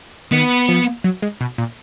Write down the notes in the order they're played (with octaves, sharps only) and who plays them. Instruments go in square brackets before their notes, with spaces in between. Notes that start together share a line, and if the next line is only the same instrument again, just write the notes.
[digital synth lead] D#3 [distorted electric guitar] B3
[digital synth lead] F3
F#3
G#3
B2
A#2